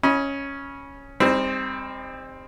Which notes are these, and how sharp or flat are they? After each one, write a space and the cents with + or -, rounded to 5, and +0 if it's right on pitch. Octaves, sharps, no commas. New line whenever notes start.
C#4 +0 D#5 +25 B5 -25
G3 +35 C4 +5 D#4 +0